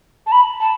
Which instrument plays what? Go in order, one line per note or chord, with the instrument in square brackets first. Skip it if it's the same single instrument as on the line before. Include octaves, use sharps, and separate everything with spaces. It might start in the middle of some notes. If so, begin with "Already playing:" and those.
[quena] A5
B5
A5